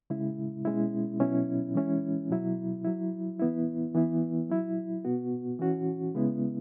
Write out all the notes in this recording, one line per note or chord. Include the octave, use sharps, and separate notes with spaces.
C#3 G#3 E4
B2 G#3 C#4 E4
B2 F#3 C#4 E4
E3 G#3 C#4 E4
B2 F#3 E4
F#3 E4
E3 B3 E4
E3 B3 E4
F#3 E4
B2 B3 F#4
E3 C#4 F#4
C#3 G#3 B3 E4